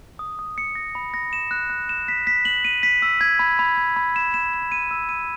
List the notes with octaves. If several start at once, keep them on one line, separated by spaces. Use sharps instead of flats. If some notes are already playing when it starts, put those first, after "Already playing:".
D#6
D#6
C#7
A#6
B5
A#6
E7
F#6
F#6
E7
B6
B6
F#7
D#7
B6
E6
G#6
B5
B5
G#6
B5
E7
E7
E7
D#7
E6
D#7